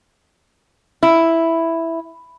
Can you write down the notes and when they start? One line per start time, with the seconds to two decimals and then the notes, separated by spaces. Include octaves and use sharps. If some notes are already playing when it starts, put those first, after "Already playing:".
1.03 E4